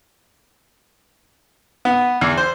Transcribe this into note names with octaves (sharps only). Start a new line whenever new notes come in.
B3
E2
C5